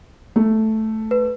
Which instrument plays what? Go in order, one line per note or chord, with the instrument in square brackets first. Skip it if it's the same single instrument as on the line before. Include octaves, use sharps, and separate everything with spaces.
[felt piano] A3
[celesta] B4